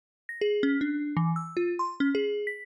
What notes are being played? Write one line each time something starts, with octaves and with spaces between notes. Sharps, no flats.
A#6
G#4
C#4
D4
E3
E6
F4
C6
C#4
G#4
B6